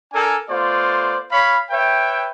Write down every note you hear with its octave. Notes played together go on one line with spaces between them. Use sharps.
D4 A4 A#4 G#5
A3 B3 F4 C5 D5
C#5 F5 B5
B4 C#5 E5 G5